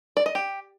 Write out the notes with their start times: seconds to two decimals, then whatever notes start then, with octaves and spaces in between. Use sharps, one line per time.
0.17 D5
0.26 D#5
0.35 G4